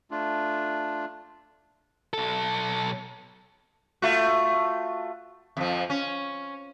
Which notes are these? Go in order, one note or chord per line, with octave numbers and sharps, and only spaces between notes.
A3 D4 F4
B1 A4
A3 F4 F#4
F2 F3
C#4